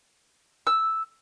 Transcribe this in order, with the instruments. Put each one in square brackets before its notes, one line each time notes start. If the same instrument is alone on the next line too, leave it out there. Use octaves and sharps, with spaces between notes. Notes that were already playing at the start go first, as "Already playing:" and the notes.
[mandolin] E6